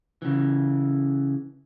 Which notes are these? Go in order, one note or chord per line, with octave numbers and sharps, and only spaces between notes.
C#3 E3